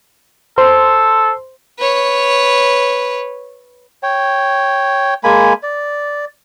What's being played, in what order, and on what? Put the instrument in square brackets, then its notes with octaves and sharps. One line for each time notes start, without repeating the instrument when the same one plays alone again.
[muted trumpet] A4 [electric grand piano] C5 C6
[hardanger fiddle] B4 C#5
[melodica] C#5 G5
G#3 A#3 G#5 B5
D5